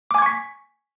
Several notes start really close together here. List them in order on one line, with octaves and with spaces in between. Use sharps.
D6 G#5 G#6 C#6 B6